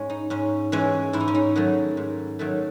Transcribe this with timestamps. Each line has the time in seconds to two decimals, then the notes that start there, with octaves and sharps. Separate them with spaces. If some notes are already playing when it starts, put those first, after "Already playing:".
Already playing: G#2 G#3 C#4
0.10 D#4
0.30 G#2 C#4
0.72 E3 G#3 C#4
1.13 G#2 E4
1.20 D#4
1.28 C#4
1.35 D#4
1.56 D#3 F#3 A3
1.97 G#2
2.39 D#3 F#3 A3